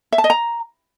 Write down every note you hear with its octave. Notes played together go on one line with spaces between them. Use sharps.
E5
A5
D#5
A#5